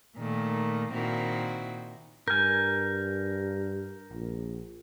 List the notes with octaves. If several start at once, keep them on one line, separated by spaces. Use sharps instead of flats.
A#2 D#3 A3
A#2 D#3 C4 E4 F#4
G2 A#4 G#5 F6 G6
A#1